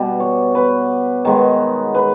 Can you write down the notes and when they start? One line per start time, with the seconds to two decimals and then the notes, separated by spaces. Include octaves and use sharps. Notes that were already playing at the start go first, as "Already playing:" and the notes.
Already playing: B2 G3 B3
0.20 C#5
0.55 B4
1.25 D#3 G#3 B3
1.94 B4